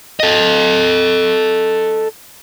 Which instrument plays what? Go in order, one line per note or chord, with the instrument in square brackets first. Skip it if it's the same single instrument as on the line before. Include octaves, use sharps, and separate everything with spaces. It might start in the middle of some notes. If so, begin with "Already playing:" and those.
[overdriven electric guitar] A4 D#5